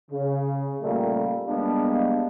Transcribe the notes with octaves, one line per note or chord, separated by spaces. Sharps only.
C#3
A#2 G3 A3 A#3
G3 G#3 A#3 B3 D4